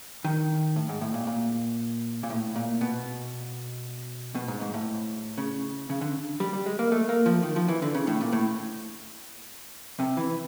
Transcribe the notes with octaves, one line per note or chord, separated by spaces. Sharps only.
D#3
A2
G#2
A2
A#2
A#2
A#2
A2
A#2
B2
B2
G#2
G#2
A2
C#3
C#3
D3
G3
G3
G#3
A#3
A3
A#3
F3
D#3
F3
E3
D3
C#3
A2
A#2
A2
C3
E3